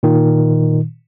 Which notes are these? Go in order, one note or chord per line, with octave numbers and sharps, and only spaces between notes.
A#2 D#3